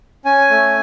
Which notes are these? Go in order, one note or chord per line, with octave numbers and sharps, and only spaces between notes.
C#4 G#5
A3